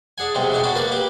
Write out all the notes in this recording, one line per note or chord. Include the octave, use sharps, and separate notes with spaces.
D4 G#4 F#5 G#5
B1 G2 C3 G3 G#3
C#3 F#3 D4 G#4
D4 F#4 B5 D6
A#3 A#4 B4 D5
G4 B4 D6